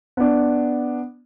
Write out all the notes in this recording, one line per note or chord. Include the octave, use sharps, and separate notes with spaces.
B3 D4